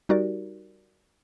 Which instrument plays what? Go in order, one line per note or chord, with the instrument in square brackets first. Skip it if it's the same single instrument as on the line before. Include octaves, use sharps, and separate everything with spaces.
[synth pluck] G3 D#4 F#4 G4 A#4 D5